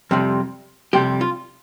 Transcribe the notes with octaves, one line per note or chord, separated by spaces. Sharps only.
F2 C3 G3
F2 C3 G3 G4
F4